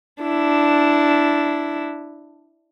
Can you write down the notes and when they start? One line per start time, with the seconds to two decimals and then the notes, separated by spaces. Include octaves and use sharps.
0.23 D4 E4